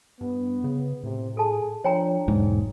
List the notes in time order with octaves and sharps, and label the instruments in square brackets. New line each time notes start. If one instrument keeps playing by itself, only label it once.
[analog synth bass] G2 [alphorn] B3
[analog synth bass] C#3
[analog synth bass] A2 [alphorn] C3
[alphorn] G#4 [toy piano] A4 A5
[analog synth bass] F3 [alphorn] D4 [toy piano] C#5 G5 A#5
[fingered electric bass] E1 G#2 [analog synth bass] F#3